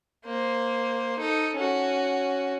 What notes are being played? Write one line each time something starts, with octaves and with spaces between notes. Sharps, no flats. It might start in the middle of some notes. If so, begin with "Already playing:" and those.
A#3 C5
D#4 A4
C#4 F#4